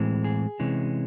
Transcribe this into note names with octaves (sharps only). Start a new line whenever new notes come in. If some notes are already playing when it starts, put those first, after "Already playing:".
Already playing: A2 E3 G#3 C4
G#4
C3 E3 G#3 C#4